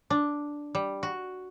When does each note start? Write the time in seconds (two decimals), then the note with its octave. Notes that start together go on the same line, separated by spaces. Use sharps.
0.10 D4
0.75 G3
1.03 F#4